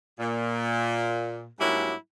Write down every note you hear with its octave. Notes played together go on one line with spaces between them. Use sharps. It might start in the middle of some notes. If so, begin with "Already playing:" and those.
A#2
G#2 F#3 G3 A#3 D4 E4